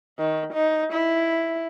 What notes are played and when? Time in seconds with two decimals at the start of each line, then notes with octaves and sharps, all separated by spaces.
0.19 D#3
0.53 D#4
0.92 E4